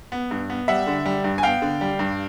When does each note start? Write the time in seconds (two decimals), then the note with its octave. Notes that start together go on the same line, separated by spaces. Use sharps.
0.12 B3
0.31 G2
0.50 B3
0.68 G3 E5 F#5
0.87 D3
1.06 G3
1.24 G2
1.38 G#5
1.43 B3 F5 G5
1.62 D3
1.81 G3
1.99 G2